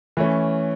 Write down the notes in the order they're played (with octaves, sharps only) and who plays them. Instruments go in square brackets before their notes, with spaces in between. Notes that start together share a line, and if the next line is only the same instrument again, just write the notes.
[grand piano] E3 A3 C#4